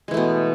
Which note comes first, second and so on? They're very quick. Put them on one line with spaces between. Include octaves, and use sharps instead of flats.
G#3 E3 A3 B2